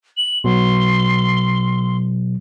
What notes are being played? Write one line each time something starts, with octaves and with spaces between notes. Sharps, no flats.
F#7
B2 F#3 C6